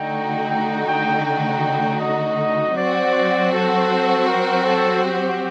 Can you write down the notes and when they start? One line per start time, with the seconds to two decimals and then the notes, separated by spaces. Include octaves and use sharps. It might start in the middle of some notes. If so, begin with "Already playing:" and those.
Already playing: D3 A3 D#4 F#4 G5
0.49 G5
0.86 G5
1.24 G5
2.00 D#5
2.76 F#3 C4 F#4 C5 D5
3.52 A4
4.27 A#4
4.65 A4
5.03 G4